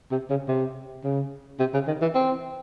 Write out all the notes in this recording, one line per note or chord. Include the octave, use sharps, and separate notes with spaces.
C3
C#3
C3
C#3
C3
C#3
D#3
E3
C4